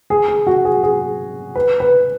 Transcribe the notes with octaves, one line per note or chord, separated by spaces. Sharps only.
G#4
G#4
F#4
G#4
G#4
B4
B4